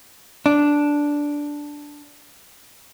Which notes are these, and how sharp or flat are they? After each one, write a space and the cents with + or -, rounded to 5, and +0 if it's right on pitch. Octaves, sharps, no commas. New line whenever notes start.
D4 -5